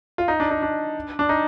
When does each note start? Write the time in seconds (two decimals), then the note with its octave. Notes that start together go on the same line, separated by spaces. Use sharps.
0.18 F4
0.28 D#4
0.40 D4
0.51 D#4
0.62 D4
1.19 D4
1.29 D#4